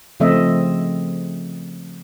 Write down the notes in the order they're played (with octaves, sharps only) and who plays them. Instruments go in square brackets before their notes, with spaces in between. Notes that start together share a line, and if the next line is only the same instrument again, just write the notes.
[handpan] C#3 F3 A3 C4 D#5 E5